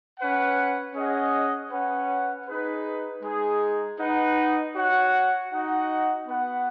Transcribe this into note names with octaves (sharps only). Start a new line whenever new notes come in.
C#4 B4 F#5
C#4 G#4 D#5 F#5
C#4 B4 F#5
D#4 G#4 B4
G#3 D#4 G#4
D#4 B4 D#5 F#5
F#4 C#5 F#5
D#4 F#4 D#5 F#5
B3 F#4 B4 F#5